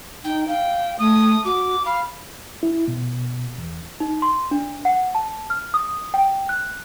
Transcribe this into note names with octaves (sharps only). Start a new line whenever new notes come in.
D#4 G5
F5 G5
A3 D#6
F#4 D6
F5 B5
E4
B2
E2
D#4
C6
D4
F#5
A5
F6
D#6
G5
F#6